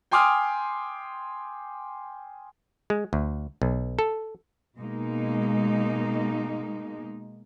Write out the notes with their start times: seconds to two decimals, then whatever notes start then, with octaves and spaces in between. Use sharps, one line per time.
0.11 G5 G#5 C6 D6 D#6 F6
2.90 G#3
3.13 D2
3.62 B1
3.99 A4
4.77 B2 G#3 A#3 D#4